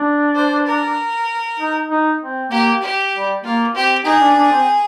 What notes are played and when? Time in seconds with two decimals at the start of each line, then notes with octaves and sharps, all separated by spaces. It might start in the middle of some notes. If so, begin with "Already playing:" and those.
Already playing: D4
0.35 C5
0.66 A#4
1.59 D#4
1.90 D#4
2.21 C4
2.51 A#3 G4
2.82 G4
3.13 G3
3.44 A#3 F4
3.74 C4 G4
4.05 D#4 G#4
4.21 D4
4.36 D4
4.52 C4